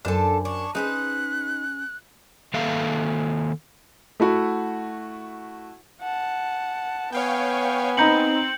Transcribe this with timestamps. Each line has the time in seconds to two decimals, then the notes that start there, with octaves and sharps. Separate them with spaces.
0.05 F#2 D4 A4 C5 G#5
0.45 D4 C#6
0.75 C#4 D#4 G#4 B4 C5 F#6
2.54 D#3 A#3 A4 E5 F5
4.20 A3 E4 F#4 F#5
6.01 F#5 A5
7.12 B3 C#5 F5 G5 G#5
7.97 C4 D#4 A#5 B5 G6 C#7 F#7